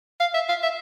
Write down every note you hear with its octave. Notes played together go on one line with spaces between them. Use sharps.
F5
E5
F5
E5